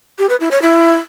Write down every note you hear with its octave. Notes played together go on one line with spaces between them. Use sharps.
G4
B4
E4
C#5
E4